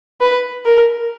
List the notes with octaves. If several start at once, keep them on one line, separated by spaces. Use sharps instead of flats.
B4
A#4